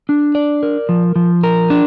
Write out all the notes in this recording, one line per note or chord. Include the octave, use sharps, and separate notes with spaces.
D4
D5
A#4
F3
F3
A#4
D4